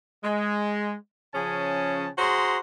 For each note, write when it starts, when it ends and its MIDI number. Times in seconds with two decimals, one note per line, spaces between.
0.24 0.95 56
1.34 2.08 49
1.34 2.08 53
1.34 2.08 61
1.34 2.08 68
1.34 2.08 81
2.18 2.59 66
2.18 2.59 68
2.18 2.59 72
2.18 2.59 82
2.18 2.59 84